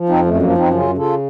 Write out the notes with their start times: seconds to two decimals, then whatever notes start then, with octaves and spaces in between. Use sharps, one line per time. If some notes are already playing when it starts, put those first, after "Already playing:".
Already playing: F3
0.09 F2 C4 D#4
0.25 F#2 A3
0.42 F3 A#3
0.57 F#2 C4 D#4
0.73 C#3 C#4 F4
0.90 C#3
0.98 F4 A4